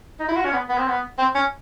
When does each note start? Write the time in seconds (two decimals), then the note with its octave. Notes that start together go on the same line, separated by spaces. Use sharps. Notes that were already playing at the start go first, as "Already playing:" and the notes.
0.20 D#4
0.28 E4
0.36 F#4
0.45 C#4
0.53 B3
0.69 B3
0.78 C4
0.88 B3
1.18 C4
1.35 C#4